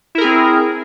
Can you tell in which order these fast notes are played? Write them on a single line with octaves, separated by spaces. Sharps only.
E4 A#4 G#4 C4